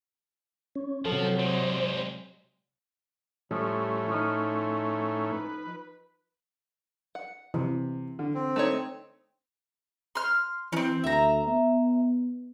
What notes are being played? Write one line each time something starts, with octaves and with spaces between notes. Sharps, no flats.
C#4
C3 F3 F#3 A4
G3 G#3 C5
A2 F3 G3 A3 C#4
F3 D#4
B4
F#5
C3 E3
D3
C4
A3 D#4 C#5
C6 F6
E3 C4 C#4
D2 E5 A#5
B3